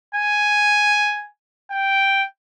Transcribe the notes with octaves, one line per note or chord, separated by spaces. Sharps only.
G#5
G5